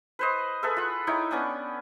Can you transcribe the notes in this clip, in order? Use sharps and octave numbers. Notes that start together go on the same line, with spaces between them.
B4 C5 D#5
G#4 A4 B4 E5
F4 F#5
D#4 E4 C#5 G5
B3 C#4 D4 D#6